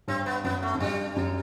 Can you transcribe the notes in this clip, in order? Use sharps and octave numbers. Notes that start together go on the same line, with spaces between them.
G2 C4
B3
F#2 B3
A3
F#2
G2 G3
F#2